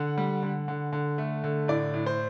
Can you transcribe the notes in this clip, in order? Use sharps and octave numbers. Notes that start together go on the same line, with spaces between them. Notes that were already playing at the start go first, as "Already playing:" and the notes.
Already playing: D3 F#5
G3
D3
D3
D3
A3
D3
A2 D5
A2
C5